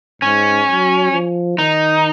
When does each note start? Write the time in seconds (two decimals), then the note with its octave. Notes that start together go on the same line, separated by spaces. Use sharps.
0.22 G#2 C#4
0.68 F#3
1.12 F3
1.58 D#3 D#4